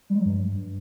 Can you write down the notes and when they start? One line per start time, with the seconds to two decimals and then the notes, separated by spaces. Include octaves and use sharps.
0.10 G3
0.15 G#3
0.20 F#3
0.25 G2